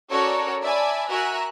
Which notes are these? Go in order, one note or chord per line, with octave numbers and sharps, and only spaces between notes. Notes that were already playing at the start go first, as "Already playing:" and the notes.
C#4 F#4 A4 A#4 C#5 D5
D5 E5 G#5 A5 B5
F#4 A#4 E5 G#5 A#5 F#6